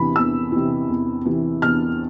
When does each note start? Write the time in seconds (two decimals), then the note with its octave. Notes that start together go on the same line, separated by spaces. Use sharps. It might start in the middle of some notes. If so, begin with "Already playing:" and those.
Already playing: E2 C3 E3 B5
0.16 E2 E6
0.52 C3 E3
0.89 E2
1.25 C3 E3
1.62 E2 F6